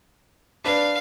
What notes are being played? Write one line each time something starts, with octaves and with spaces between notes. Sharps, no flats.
D4 B4 F5